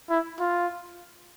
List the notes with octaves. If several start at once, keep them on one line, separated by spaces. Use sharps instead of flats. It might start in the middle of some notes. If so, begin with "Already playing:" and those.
E4
F4